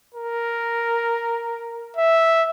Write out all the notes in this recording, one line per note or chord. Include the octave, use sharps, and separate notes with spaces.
A#4
E5